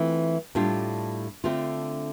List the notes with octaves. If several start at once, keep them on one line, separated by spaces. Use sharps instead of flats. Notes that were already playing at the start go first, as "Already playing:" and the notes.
Already playing: E3 A3 C4 F4
A2 G3 D4 F4
D3 A3 C4 F4